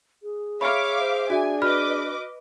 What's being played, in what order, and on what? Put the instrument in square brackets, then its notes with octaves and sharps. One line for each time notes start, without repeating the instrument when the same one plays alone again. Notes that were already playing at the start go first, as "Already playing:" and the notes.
[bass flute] G#4
[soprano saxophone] C#5 [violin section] E5 F5 D6 [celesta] B5 F6
[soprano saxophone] C5
[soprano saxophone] D4 [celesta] F#4 E5 [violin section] G#5
[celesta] F#4 B5 F6 [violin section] B4 D#5 D6